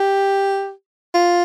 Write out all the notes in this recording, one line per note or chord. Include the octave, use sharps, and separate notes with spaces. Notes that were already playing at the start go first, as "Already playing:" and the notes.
Already playing: G4
F4